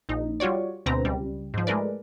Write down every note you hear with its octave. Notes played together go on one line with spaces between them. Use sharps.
A#1 D#4
G3 F4 F#4 C#5 D5
D2 B2 C4 B4 A#5
C#2 G3
G#2 F3
G#3 A3 A#4 B4 D5